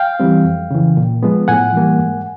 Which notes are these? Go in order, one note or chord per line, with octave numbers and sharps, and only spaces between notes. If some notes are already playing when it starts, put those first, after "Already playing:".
Already playing: F5 G5
E3 G3 C4
F2
C#3 E3
A#2
F3 G#3 B3
A2 F#5 G#5
E3 G3 A#3
G#2